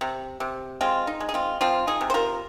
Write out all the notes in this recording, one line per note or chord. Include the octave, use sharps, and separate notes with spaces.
C3
C3
G#3 C4 F4
D#4
G#3
G#4
C4 F4
F3 C4 F4
D#4 G#4
C3
C5
F4 A#4